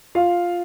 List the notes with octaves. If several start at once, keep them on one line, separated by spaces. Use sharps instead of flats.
F4 F5